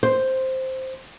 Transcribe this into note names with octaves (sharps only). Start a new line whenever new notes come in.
C5